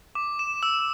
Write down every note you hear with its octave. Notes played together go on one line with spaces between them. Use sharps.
D6
E7
E6